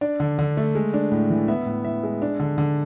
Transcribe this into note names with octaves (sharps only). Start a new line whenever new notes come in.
D4 D5
D3
D3
A3
G#3
D4
A2
E3
B3 E5
A2
A2 E5
G#3
D4
D3
D3